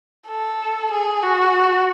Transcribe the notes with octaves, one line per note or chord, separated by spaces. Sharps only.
A4
G#4
F#4